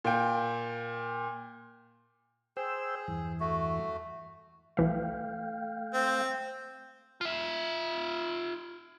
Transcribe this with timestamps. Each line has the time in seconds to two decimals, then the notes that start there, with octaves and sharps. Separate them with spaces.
0.04 A#2 G5
2.57 G#4 C5 G5 E6
3.08 E2 G2 E3
3.40 A3 F#4
4.77 B1 E3 A3 E5 F5 G5
5.94 C4
7.21 F4 E5